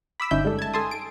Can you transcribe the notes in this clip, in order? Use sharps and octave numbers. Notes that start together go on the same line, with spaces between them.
B5 D6 E6 B6
G1 C#4 D#4 E5 E6 G6
G3 G#3 A4
A5 G#6
A4 G#5 A5 C6 D#6
D7